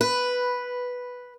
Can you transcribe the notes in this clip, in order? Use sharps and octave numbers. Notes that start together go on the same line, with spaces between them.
B4